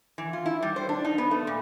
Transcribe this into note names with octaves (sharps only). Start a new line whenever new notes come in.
E3
F4
E4
G3
C5
D4
D#4
B3
A3
A#2